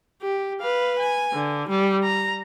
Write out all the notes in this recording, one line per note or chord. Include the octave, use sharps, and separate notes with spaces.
G4
B4 F5
G#5
D3
G3
A#5